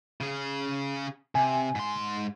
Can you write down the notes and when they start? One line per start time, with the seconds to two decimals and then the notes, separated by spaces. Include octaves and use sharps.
0.21 C#3 G#4
1.35 C3 G#5
1.75 G#2 C6